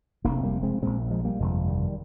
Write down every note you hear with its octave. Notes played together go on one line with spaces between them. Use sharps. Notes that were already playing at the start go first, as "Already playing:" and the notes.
F1 F2 C3 A#3 D4
G3 A#3
G#3 C4
A#1 A#2 G#3 C4
F3 G#3
G3 A#3
G1 F2 C3 F3 G#3
D#3 G3